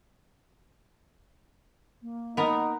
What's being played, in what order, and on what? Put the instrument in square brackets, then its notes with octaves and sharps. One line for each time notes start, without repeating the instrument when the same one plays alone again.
[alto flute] A#3
[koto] B3 A#4 [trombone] D#4